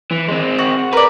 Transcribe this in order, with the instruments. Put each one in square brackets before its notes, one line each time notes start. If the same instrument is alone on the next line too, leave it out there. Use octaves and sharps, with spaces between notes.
[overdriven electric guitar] E3
G#3 C4
[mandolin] F#4
[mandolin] A#4 D5 [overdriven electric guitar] B4